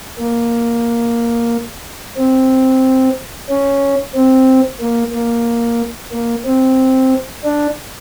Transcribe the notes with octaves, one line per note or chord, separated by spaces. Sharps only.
A#3
C4
C#4
C4
A#3
A#3
A#3
C4
D4